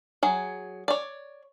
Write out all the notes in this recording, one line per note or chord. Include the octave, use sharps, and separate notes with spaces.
F#3 G#4
C#5 D5